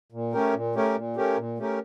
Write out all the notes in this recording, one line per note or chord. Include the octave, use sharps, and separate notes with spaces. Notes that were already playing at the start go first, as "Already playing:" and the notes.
A#2
A3 C#4 G4 A#4
A#2
A3 C#4 G4 A#4
A#2
A3 C#4 G4 A#4
A#2
A3 C#4 G4 A#4